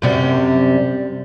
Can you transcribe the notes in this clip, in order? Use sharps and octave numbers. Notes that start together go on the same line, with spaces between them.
F#2 C3 G3